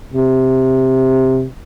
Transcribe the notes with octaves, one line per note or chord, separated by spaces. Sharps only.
C3